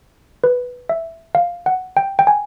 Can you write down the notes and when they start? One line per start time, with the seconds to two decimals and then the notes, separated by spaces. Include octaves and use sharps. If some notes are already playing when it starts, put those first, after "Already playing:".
0.44 B4
0.89 E5
1.35 F5
1.66 F#5
1.97 G5
2.19 G5
2.27 G#5